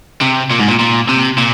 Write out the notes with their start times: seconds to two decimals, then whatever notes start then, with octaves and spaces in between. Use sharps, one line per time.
0.22 C3
0.51 A#2
0.60 G#2
0.68 A#2
0.79 A#2
1.09 C3
1.38 A#2